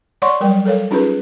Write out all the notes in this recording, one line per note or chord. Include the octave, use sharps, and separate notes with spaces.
C#5 D5 F#5 C6 C#6
F#3 G3 A#4 G5
A4 A#4 C#5 F5
C#4 D#4 F4 G#4 A#4 B4